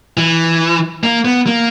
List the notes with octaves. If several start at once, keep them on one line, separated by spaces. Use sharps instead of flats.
E3
A#3
B3
A#3